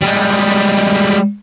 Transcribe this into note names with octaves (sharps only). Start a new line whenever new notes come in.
G3 G#3